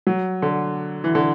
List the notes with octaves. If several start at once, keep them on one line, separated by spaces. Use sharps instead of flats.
F#3
D3
E3
D3